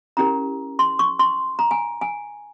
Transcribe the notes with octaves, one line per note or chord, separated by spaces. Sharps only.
C#4 E4 G4 A#4 A#5
C6
C#6
C6
A#5
G#5
G#5